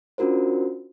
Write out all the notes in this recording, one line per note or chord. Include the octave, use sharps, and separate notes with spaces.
C#4 D4 F4 F#4 A#4 C5